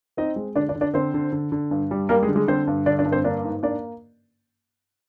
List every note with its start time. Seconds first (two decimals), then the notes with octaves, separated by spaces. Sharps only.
0.17 C4 D#4 D#5
0.36 G#3
0.56 D3 D4 D5
0.69 D4 D5
0.76 D3
0.81 D4 D5
0.94 D3 C4 C5
1.14 D3
1.32 D3
1.52 D3
1.71 G2
1.91 G3
2.09 G3 A#3 A#4
2.23 G#3 G#4
2.28 D3
2.35 G#3 G#4
2.48 D3 C4 C5
2.67 G2
2.86 D3 D4 D5
2.99 D4 D5
3.05 G2
3.12 C4 C5
3.24 A#3 D4 D5
3.44 G#2
3.63 A#3 D4 D5